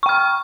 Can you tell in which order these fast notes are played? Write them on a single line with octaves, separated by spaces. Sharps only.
C#6 G5 F6